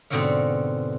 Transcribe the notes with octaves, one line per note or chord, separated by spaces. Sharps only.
G#2 B2 D3 C4 C#5 F5